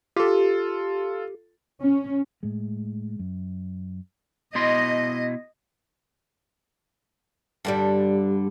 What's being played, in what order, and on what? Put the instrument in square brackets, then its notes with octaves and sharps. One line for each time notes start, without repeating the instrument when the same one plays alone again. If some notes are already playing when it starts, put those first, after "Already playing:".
[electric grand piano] F4 A4 [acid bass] G4
[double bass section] C#4
[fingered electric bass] A2 G#3
F#2
[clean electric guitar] B2 E4 C6 [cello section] D#5
[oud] G2 D3 G3